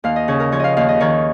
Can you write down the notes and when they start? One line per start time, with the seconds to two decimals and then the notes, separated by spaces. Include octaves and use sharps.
0.04 D#2 F5
0.16 D#5
0.28 C#3 C#5
0.40 A#4
0.52 F3 C#5
0.60 D#5 F5
0.77 D#2 F5
0.89 D#5
1.00 D#3 C#5